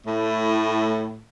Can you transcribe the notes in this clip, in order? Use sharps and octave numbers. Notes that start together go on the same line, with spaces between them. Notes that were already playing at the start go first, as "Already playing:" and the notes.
A2